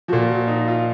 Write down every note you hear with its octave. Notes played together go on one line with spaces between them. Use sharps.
A#2 F3 F#4
F#4
D#4
F4